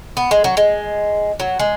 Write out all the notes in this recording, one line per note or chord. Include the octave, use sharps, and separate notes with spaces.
B3
G#3
F#3
G#3
F#3
G#3